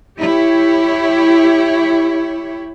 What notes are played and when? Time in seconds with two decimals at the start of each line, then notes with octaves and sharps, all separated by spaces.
0.19 E4 G4 C#5